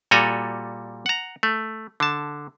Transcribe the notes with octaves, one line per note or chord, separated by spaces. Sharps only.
A#2 G3 F#4 A4 G#5 A#5
F#5 A#5
A3
D3 A5